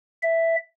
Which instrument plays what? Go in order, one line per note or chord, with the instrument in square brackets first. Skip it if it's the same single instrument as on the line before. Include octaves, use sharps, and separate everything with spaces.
[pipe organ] E5